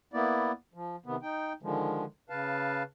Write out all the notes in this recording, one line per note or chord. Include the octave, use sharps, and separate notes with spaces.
A#3 B3 E4 D5
F3
C3 D#3 B3
D#4 G5
D3 D#3 F3 G#3
C#3 B4 F5 A5